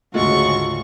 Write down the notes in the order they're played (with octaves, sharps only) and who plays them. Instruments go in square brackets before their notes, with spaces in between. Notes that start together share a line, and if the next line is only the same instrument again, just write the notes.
[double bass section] D2 G#2 C#3 [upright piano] G#3 A3 F4 [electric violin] F#4 C#6